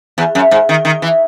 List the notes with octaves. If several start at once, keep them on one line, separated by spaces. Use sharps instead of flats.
E2
F#2
G#2
D#3
D#3
E3